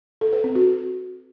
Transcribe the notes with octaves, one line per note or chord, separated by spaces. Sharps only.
A4
B4
C4
F#4